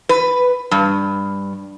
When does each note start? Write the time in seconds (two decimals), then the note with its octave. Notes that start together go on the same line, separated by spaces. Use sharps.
0.09 B4
0.71 G2